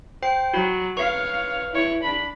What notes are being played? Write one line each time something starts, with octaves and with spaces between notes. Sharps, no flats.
C5 G5 C7
F#3 F#4 B5
B4 C#5 F5 C#6
E4 C#5
D4 B5